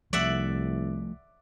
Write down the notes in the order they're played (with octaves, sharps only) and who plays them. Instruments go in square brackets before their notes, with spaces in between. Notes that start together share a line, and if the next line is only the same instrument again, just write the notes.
[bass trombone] C2 [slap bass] F3 A3 [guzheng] D5 E5 F#5